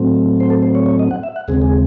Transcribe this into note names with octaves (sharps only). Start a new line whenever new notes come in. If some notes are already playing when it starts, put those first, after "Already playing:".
Already playing: A2 F#3 A3 C4
C5
A4
C5
C#5
C#5
D#5
F#5
E5
F#5
D#2 C#3 G#3 C4 G#4
G#4